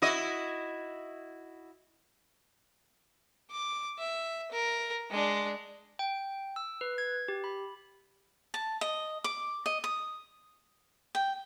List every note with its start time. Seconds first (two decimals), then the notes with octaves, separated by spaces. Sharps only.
0.02 E4 F#4 D#5
3.51 D6
3.99 E5
4.52 A#4
5.10 G#3 D4
5.99 G5
6.56 E6
6.81 B4
6.98 G#6
7.28 G4
7.44 B5
8.54 A5
8.81 D#5
9.24 D6
9.66 D#5
9.84 D#6
11.15 G5